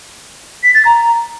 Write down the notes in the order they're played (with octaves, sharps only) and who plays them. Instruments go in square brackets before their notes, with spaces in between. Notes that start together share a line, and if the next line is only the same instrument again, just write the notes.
[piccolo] B6
A6
A#5